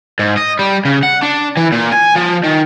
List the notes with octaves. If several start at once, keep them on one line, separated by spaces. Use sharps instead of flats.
G#2
D#5
G3
C#3
F#5
D4
E3
A#2
G#5
F3
D#3